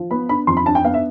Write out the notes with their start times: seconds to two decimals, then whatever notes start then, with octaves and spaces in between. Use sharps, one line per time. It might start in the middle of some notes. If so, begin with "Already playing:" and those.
Already playing: F3
0.11 B3 B5
0.29 D4 B5
0.47 F2 C6
0.57 B5
0.66 D4 A5
0.75 G5
0.84 B3 F5
0.94 E5